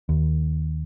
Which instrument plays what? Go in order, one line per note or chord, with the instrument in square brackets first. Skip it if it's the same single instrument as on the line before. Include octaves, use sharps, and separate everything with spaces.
[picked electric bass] D#2